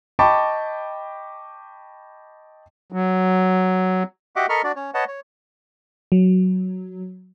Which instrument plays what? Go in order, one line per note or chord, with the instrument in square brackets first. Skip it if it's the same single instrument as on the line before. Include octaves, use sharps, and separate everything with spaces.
[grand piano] D#5 G5 A5 B5 C#6 D6
[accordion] F#3
[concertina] F#4 G4 D#5 E5 F#5 D6
A4 A#4 D#5 B5 C#6 F6
D4 F#4 D5
C#4 C#5
B4 C#5 D#5 F#5 A5
C#5
[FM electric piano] F#3